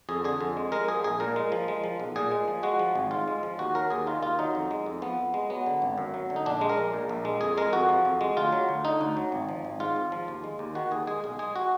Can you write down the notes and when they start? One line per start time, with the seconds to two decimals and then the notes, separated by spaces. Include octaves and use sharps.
0.09 F2 G#4
0.24 D3 G#4
0.41 F2
0.57 G#3
0.72 G#3 A#4
0.88 F3 G#4
1.04 A#1 G#4
1.20 A#2 A#4
1.36 G#3
1.52 F3
1.68 G#3
1.84 F3
2.00 B1
2.16 A#2 G#4
2.31 G#3
2.48 F3
2.63 G#3 F#4
2.79 F3
2.95 G#1
3.11 G#2 F4
3.28 G#3
3.43 F3
3.59 D#2 F#4
3.75 F#3 A#4
3.90 D#2 G#4
4.07 D#3 F4
4.22 D#2 F4
4.39 F#3 D#4
4.55 F2
4.71 G#3
4.86 F2
5.02 F3 B3
5.18 F2
5.34 G#3
5.50 F#3 B3
5.66 D3
5.82 G#1
5.98 F#2
6.14 F#3
6.30 D3
6.36 D#4
6.46 A#1 D4
6.61 G#3
6.69 A#4
6.78 A#1
6.94 A#2
7.09 A#1
7.25 G#3
7.41 F2 G#4
7.57 G#3 A#4
7.73 F2 F#4
7.89 F3
8.05 F2
8.21 G#3
8.37 D2 F4
8.52 F#3
8.69 D2
8.85 D3 D#4
9.01 D2
9.17 F#3
9.32 G#1
9.49 F3
9.65 G#1
9.80 G#2 F4
9.96 G#1
10.12 F3
10.28 D#2
10.44 G#3
10.59 D#2
10.75 D#3 F#4
10.91 D#2 G#4
11.07 G#3 G#4
11.24 B1 G#4
11.39 G#3 G#4
11.56 F#4